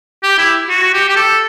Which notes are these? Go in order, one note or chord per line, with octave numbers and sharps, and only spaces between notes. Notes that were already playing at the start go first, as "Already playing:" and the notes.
G4
E4
F#4
G4
G4
A4